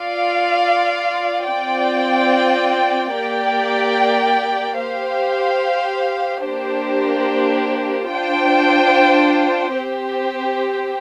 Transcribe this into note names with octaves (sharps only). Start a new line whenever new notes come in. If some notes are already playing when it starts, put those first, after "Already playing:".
Already playing: F4 D5 F5
C4 F4 D5 G5
A#3 G4 D5 G5
G4 C5 F5
A#3 D4 G4 C5
D4 F4 C5 G5
C4 G4 C5